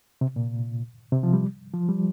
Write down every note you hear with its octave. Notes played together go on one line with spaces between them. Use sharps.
C3
A#2
C3
F3
G3
F3
G3